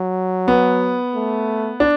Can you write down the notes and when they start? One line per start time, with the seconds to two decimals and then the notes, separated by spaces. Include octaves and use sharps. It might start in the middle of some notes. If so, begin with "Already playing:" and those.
Already playing: F#3
0.48 B3
1.14 A3
1.80 D4